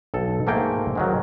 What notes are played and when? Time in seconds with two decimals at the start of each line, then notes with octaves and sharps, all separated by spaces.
0.14 B1 A4
0.47 G#2 A3 A#3 G5
0.95 G#2 D#3 F#3